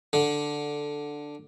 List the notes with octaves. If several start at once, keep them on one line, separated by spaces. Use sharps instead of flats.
D3